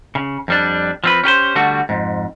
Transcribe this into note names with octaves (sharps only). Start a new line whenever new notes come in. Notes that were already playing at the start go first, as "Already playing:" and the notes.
C#3
F2 G3 D4
F3 C4 B4
C#4 G4 B4 C5
D3 G3 A3 F#4
F2 G#2